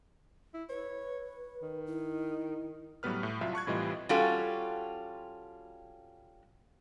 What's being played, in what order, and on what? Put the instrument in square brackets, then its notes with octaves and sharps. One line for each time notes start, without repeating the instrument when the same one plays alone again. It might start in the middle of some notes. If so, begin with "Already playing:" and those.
[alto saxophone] E4
[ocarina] B4 [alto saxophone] C#5
[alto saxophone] D#3
[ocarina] E4
[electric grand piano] A2 F#3 G3 B3 B4 F6
A2
C2 F#3 F4 E5
A5 C#6 F#6 G#6
A2 C3 E3 G3 F4 D#5
[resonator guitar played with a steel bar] G3 C#4 F4 F#4 A4